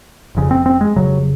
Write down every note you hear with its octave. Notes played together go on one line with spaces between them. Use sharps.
F1 F2 C#3
C4
C4
G#3
F1 F2 C#3 F#3